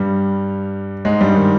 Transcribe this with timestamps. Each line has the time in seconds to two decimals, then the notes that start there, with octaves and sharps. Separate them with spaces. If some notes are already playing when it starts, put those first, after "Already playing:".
Already playing: G2 G3
1.05 G#2 G#3
1.21 G2 G3
1.36 D#3